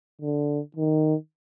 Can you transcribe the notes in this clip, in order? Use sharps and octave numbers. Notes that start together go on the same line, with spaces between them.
D3
D#3